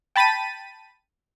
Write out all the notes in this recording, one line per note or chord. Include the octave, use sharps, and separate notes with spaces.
G5 A5 B5 A6 B6 D#7